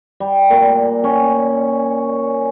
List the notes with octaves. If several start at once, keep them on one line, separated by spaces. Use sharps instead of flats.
G3
A#2
C#4